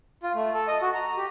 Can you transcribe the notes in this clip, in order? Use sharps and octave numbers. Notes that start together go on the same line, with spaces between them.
F4
A3
A4
D#5
F#4
A#5
G4